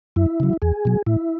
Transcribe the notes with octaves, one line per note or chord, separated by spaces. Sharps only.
F#2 E4
C#3 F#3
E2 G#4
B2 F#3
A2 E4